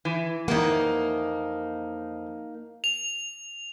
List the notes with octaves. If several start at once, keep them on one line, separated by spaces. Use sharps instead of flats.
E3
F2 E3 A#3 D#4 F#5
F7